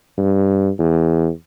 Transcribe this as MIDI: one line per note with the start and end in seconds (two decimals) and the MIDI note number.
0.18 0.69 43
0.79 1.29 40